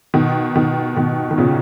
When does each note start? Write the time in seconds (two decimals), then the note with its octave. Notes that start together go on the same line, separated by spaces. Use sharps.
0.14 B2 D#3
0.56 B2 D#3
0.96 B2 D#3
1.31 D#3
1.38 A#2 C#3